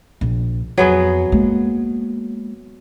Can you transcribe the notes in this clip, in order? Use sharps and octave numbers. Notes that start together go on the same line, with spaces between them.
A#1
F2 F#3 B3 G#4
G#3 A#3